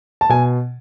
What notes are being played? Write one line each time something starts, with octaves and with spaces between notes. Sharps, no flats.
A5
B2 G#5